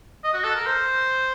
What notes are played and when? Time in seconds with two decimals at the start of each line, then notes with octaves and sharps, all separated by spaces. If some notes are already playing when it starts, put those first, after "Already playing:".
0.24 D#5
0.34 F#4
0.44 A4
0.55 A#4
0.67 C5